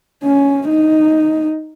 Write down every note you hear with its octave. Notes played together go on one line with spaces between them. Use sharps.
C#4
D#4